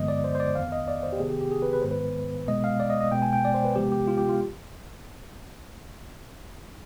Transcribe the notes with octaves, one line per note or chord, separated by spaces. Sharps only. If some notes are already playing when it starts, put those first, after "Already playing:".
Already playing: G2 D3 F3 G#3 B3 D#5
D5
C5
C5
D5
F2 D#3 B3 F5
D#5
D5
C5
G4
C3 D#3 B3 G#4
G4
G4
G#4
B4
B4
G#2 D#3 G#3 B3 C5
B4
B2 G#3 B3 D#5
F5
D5
D#5
D#5
B2 G#3 B3 G5
G#5
G5
D5
C5
B4
C3 F3 G#3 B3 G4
G4
F4
G4
F4